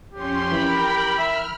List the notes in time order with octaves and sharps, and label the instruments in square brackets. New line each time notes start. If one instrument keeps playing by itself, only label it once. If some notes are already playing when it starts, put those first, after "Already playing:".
[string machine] F2 C#4 C6 [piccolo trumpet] G4
[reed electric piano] E3 [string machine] A#4 G5 [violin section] B5
[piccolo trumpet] E5 [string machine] F6